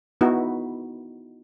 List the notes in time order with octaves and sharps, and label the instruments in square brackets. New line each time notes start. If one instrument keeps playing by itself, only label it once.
[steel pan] B3 D#4 E4 F#4